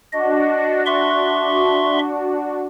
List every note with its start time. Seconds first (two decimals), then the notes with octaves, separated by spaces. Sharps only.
0.13 D4 F#4 D#5
0.86 E5 C6 C#6